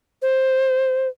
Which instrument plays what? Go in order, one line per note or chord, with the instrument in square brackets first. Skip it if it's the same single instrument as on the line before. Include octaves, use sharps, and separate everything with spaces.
[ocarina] C5